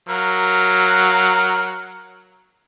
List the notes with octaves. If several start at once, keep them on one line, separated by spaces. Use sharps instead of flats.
F#3 A#4 F5